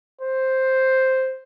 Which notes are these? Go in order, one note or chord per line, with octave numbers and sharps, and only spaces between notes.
C5